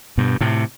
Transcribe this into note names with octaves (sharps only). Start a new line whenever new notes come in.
G2 B2
A2 C3